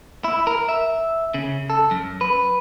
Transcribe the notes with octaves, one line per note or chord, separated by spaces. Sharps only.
E4
A#4
E5
C#3
A4
F#2
B4